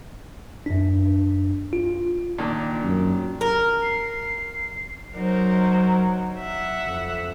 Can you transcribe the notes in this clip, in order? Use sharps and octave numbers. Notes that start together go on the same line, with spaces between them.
F#2 D4
F4
A#2 D#3 D4
F#2
A#4 F6
C7
F#3 D#4 A#4 C5
E5 F#5
F2